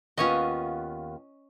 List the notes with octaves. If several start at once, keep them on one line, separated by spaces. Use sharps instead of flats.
D#2 B3 C#4 F4 C#5 D#5